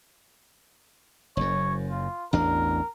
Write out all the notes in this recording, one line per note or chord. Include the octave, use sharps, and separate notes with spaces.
F#1 F#2 C#5
F4
A1 E2 D4 A#4